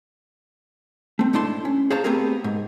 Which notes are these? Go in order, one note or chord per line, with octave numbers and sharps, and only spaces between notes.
A3 C4
G#2 A3 D4 E4 A5 C6
C#4
G#4 C5 C#5 F5 A5 A#5
A3 B3 C4 G4 G#4 A#4
G#2